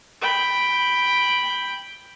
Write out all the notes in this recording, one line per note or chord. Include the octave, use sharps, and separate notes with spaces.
G5 B5